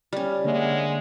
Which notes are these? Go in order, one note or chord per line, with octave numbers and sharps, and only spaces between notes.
G3 C#4
D3 G#3 A#3 C#5 E5 F#5